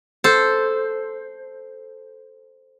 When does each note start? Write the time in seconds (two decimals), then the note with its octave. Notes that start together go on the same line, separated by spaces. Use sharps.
0.24 A4 C5